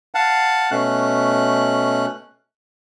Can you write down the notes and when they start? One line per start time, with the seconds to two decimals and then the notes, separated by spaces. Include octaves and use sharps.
0.15 F5 F#5 A5
0.71 B2 A3 C#4 F#6